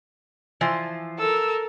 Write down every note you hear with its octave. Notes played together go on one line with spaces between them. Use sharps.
E3 F3 C5
A4 A#4 E6